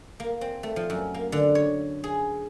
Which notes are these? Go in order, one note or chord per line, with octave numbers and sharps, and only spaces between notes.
A#3
C4
A3
F3
F#2
A#3
D3
C#5
G#4